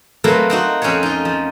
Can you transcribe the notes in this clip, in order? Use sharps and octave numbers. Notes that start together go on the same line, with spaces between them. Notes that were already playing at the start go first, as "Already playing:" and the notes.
F#3 A3 A#3 C4 A#4 B4
C4 D#4 F#4
F2 C4 C#4 F#4 C5 C#5
D#4 F4
F3